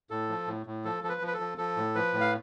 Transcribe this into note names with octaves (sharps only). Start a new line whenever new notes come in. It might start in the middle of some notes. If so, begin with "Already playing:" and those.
A2 A4
F3
A2
A2
F3 A4
F3 A4
B4
F3
B4
A4
F3
F3 A4
A2
F3 B4
A2
F5